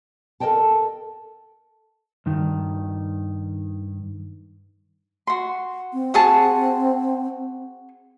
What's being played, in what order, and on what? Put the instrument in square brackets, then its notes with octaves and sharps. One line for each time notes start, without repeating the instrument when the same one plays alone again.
[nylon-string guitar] A4 A#4 C#5 D#5 G5 A5
[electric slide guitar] G2 D#3
[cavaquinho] F#4 C6
[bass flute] C4
[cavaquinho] F#4 G#4 A5